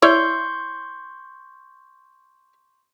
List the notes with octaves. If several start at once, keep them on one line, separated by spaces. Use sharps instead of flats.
E4 C#5 D5 C6 C#6 G6